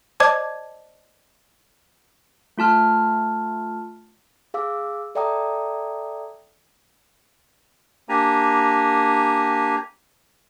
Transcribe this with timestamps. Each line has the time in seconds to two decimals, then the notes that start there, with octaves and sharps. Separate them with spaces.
0.20 C5 D5 D#5 A5 D6 G#6
2.58 A3 F4 A5 F6
4.54 G#4 F5 D6 E6
5.15 A4 D5 E5 G5 A#5 D#6
8.09 A#3 D4 G4 G#5 A#5